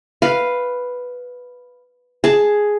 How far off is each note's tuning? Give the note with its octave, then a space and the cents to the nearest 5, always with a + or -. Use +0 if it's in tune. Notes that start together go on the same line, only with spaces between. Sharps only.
B4 +0 F5 +0
G#4 +5 A5 +0